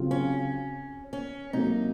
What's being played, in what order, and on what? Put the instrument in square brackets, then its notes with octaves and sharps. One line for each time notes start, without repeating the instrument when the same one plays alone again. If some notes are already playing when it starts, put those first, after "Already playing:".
Already playing: [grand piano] C#3 F#3 C4 F4
[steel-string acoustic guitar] C#4
C#4
[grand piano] C3 F#3 A#3 [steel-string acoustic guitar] D#4